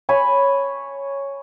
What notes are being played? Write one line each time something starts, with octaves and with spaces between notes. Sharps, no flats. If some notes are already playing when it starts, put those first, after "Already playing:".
C#5 G#5 B5